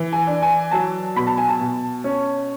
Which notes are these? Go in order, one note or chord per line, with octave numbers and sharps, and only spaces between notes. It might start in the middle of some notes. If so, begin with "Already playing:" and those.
Already playing: E3
G#5
D4
G#5
F#3 A5
B2 B5
A5
G#5
A5
B2
C#4